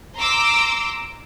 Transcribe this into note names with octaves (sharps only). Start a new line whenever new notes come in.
A#5 C6 D6 E6